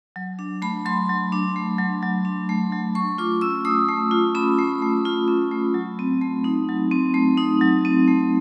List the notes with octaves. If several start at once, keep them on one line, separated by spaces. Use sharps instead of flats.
F#3
D4
A3 B5
F#3 C6
F#3
D4
A3
F#3
F#3
D4
A3
F#3
A3 C#6
F4 D6
C#4 E6
A3 D#6
A3
F4
C#4 B5
A3
A3
F4
C#4
A3
F#3
C4
A3
D#4
F#3
C4
A3
D#4
F#3
C4
A3